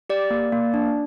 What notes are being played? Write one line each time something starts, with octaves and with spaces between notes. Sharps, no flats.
G4 D5
A#3
A#3
D4